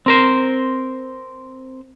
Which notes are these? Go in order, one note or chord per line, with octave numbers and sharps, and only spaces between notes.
C4 A#4 C5